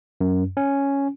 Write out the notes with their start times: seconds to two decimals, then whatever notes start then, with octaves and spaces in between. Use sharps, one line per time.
0.21 F#2
0.57 C#4